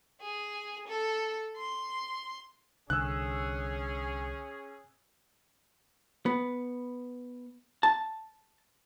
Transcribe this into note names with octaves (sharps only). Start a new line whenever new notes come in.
G#4
A4
C6
C2 D3 C#4 G#4 E6 F#6
B3
A5